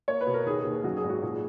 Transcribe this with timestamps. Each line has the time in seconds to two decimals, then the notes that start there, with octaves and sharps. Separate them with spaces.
0.08 A#3 C#5
0.21 B4
0.27 B2
0.34 A#4
0.46 D#2 G#4
0.59 G#4
0.65 D#2
0.84 F#2 F#4
0.97 G#4
1.03 G#1
1.09 F#4
1.22 A#2 G#4